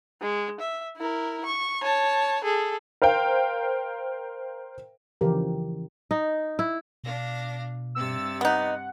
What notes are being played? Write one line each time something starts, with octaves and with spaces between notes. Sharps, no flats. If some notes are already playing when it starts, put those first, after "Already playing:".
G#3
E5
E4 A#4
C#6
C#5 A5
G#4 A4
A#4 C5 F5 G5
C#3 E3 F3 G4 A#4
D#4
E4
B2 D4 F5 A#6
G2 C3 E6 A6
B3 D#4 F#5